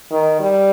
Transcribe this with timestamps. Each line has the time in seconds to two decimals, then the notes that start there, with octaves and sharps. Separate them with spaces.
0.11 D#3
0.40 G3